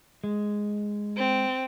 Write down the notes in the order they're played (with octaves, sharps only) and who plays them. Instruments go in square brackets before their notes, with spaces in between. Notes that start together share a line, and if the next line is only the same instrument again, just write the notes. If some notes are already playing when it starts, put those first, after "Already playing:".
[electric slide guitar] G#3
[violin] C4